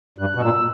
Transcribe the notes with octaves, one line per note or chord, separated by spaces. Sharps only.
G2 F#6
B2
A#2 E6